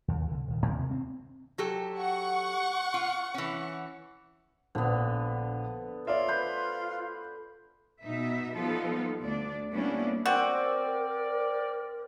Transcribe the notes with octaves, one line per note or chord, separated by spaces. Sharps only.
D#2
C2 D3
D#1 D#3
D#2 C3 D#3
C4
F#3 G4 A4
F#5 C#6
F4
E3 C#4
A#1 D3 B3
F4 C#5 D5 E5
B4 C5
B2 D#4 E5
F3 G3 B3 D#4 F4 A4
D2 D4 D5
G3 A#3 B3 C#4 D4 E4
C4 F#4 A#4 C5 D5